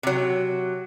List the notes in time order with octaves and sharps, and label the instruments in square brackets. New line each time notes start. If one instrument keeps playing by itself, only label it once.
[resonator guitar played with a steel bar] C3 F#3